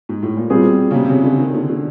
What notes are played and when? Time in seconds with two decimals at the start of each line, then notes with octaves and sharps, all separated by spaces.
0.09 G#2
0.23 A2
0.37 A#2
0.50 B2 G3 C4 F4 G#4
0.91 C#3
0.94 C3
1.05 C3
1.09 C#3
1.24 D3
1.39 D#3
1.54 D3
1.69 D3